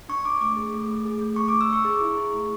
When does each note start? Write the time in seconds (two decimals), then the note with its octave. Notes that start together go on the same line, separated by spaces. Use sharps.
0.09 D4 C#6
0.25 D4 D6
0.41 A3 D6
0.57 G#4
0.73 A3
0.89 A3
1.05 G#4
1.21 A3
1.36 A3 C#6
1.48 D4 D6
1.61 E6
1.69 D4 C#6
1.85 G#4
2.01 E4
2.17 G#4
2.33 A3